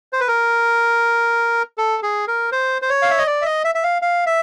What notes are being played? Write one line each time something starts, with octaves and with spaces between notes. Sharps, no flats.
C5
B4
A#4
A4
G#4
A#4
C5
C5
C#5
F5
E5
D#5
D5
E5
D#5
E5
E5
F5
F5
E5